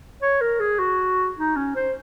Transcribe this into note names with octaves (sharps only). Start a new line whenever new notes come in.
C#5
A#4
G#4
F#4
D#4
C#4
C5